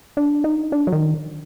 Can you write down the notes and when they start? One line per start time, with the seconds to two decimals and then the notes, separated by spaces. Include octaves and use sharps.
0.17 D4
0.44 D#4
0.72 D4
0.87 F#3
0.92 D#3